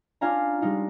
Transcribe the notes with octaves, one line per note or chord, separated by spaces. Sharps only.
C#4 D4 F4 F5 G#5 A#5
G3 G#3 D#4 F4